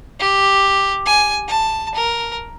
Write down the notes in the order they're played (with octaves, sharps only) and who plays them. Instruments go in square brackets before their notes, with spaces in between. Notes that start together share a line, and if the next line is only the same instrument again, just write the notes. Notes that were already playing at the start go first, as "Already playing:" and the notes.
[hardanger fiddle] G4
G#5
A5
A#4